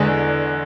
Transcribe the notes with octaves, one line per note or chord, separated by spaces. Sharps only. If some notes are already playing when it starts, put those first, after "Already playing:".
Already playing: E2 D3 G#3